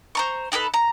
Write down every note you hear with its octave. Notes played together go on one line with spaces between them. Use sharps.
C5 A#5 C#6
D#4 G4 A4 B4
A#5